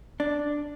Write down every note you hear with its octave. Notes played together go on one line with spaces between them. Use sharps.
D4